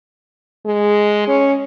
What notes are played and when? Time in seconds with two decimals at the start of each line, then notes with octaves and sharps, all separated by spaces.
0.65 G#3
1.28 C#4